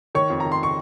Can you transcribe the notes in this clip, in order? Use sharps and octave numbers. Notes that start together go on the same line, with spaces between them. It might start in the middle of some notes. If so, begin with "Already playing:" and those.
D#3 C#5 C#6
F2
D#3 A#5
C6
C#6